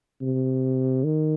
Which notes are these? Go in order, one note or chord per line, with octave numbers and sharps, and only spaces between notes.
C3
D#3